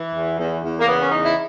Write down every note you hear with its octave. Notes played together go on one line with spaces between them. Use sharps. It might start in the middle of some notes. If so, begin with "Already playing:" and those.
Already playing: E3
E2
E2
E2
A#3
C#3 B3
C#4
E2 D#4
E4